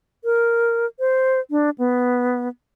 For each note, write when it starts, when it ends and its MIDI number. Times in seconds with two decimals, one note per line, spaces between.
0.24 0.86 70
1.00 1.40 72
1.50 1.70 62
1.78 2.48 59